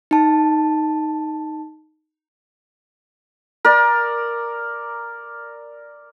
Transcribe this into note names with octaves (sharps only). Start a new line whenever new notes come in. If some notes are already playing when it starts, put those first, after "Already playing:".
D#4 A5
A#4 D5